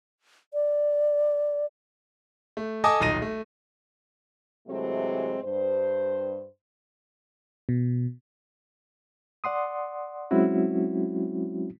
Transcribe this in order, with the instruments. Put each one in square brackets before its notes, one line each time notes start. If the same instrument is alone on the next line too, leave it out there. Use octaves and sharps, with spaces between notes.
[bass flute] D5
[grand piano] A3
A4 D#5 G#5 A5 D6 D#6
D#1 B1 D#4 A#6 D#7
A3
[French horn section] C3 E3 F#3 G#3 A3 C4
G2 C5
[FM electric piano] B2
[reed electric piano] D5 F#5 C6 D#6
F#3 G#3 C4 C#4 E4 F#4